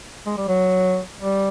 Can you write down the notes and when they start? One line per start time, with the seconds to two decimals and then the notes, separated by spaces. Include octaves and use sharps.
0.26 G#3
0.37 G3
0.48 F#3
1.20 G3